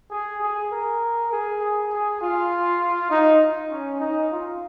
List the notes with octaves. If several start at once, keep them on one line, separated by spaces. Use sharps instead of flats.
G#4
G#4
A#4
G#4
G#4
G#4
F4
D#4
C#4
D#4
F4